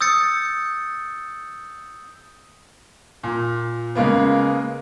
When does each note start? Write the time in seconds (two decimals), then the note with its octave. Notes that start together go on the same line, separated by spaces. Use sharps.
0.01 D#6 E6 G6 A6 C#7
3.23 A#2
3.95 C#3 G#3 A#3 B3